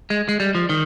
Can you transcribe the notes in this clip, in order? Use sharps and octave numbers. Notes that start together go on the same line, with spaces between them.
G#3
G#3
G3
F3
D#3